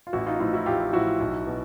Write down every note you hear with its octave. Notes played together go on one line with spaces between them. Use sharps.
F4
A1 E4 F#4
D#4 F4
A2 F3 D#4 F4
E4 F#4
A1 F4 G4
A2 F3 E4 F#4
B1
B2